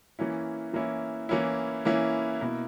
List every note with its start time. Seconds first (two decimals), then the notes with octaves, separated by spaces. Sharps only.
0.19 E3 A#3 C#4 E4
0.74 E3 A#3 C#4 E4
1.29 E3 A#3 C#4 E4
1.85 E3 A#3 C#4 E4
2.41 B2 A#3 E4